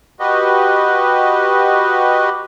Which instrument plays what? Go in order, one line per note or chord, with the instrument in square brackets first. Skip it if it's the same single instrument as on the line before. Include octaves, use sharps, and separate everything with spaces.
[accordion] F#4 G4 B4 D#5